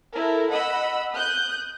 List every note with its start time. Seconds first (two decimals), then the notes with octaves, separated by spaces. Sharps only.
0.14 E4 A4 A#4
0.51 D#5 F#5 B5 E6
1.13 D#6 F#6 G6